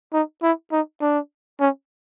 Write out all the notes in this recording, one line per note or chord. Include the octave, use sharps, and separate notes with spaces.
D#4
E4
D#4
D4
C#4